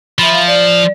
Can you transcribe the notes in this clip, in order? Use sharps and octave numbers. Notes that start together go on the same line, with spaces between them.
F3 E5 B5
F5
D5